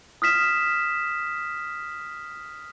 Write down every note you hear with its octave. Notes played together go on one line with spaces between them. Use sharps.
D#6 F6 B6 E7